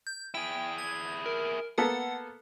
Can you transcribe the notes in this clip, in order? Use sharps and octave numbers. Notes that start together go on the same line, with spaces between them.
G6
E4 G#4 G5
G#6
A#4
A#3 B3 A4 F#5